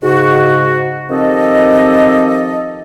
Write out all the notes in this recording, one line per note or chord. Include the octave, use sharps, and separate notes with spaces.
G#2 C#3 F#4
D#3 F3 C4 G4 A4 D#5